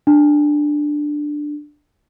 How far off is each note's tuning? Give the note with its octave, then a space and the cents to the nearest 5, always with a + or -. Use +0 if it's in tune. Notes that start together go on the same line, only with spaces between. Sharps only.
D4 +10